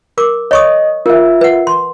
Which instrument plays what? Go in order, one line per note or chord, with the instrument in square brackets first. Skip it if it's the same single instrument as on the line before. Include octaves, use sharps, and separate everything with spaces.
[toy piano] A#4 D6
[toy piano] C#5 C#6 D#6 [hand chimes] D#5
[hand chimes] F4 E5 [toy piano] A#4
[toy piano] B4 F#5
C6